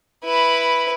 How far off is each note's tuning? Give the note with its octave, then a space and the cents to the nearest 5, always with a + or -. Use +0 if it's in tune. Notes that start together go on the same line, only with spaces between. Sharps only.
E4 +0 B4 +0